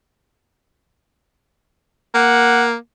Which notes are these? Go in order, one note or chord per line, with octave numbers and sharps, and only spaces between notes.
A#3 F#5